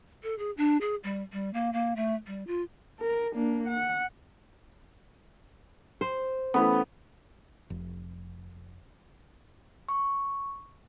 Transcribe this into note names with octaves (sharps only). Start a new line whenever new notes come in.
A4
G#4
D4
G#4
G3
G3
A#3
A#3
A3
G3
F4
A#4
A#3 D4
F#5
C5
E3 A3 B3 C#4 A4 B5
F1
C#6